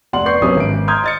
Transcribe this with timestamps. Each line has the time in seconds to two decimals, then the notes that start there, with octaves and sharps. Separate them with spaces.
0.13 F1 D5 F#5 C6 F#7
0.25 B3 D5 C#6 G6 C7
0.42 C2 C3 F#3 B3 C#4 D#6
0.57 G#1 D7
0.87 A#5 C6 D#6 F6 G6 G#6
1.04 D#5 A6 C#7